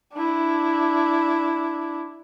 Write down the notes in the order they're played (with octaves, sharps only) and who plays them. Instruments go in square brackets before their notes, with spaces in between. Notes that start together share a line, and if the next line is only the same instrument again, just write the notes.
[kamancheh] D4 E4